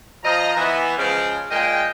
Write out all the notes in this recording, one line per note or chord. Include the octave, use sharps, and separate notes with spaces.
F3 D#5 A#5
E3 B3
C#3 F3 G#3
A#2 G#3 D#5 G5